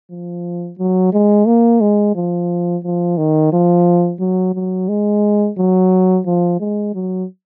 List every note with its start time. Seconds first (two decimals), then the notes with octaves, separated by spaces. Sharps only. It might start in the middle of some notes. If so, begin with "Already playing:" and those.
0.11 F3
0.79 F#3
1.13 G#3
1.47 A#3
1.81 G#3
2.15 F3
2.84 F3
3.18 D#3
3.53 F3
4.21 F#3
4.55 F#3
4.89 G#3
5.58 F#3
6.26 F3
6.60 G#3
6.94 F#3